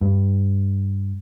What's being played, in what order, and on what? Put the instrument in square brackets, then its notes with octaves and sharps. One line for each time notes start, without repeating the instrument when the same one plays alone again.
[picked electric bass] G2